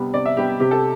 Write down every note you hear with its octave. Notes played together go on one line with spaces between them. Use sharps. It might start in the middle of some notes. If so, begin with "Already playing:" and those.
Already playing: C3 G3 B3
C3 D5
E5
G3 B3 G4
C3 G4
A4